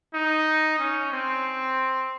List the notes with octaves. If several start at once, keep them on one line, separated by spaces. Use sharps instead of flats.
D#4
C#4
C4